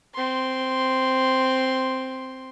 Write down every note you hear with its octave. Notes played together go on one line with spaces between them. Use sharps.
C4 C6